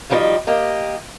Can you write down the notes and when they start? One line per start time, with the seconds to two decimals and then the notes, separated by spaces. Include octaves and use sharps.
0.10 D2 D#3 F3 G3 B4 D#5
0.47 A#3 G4 D#5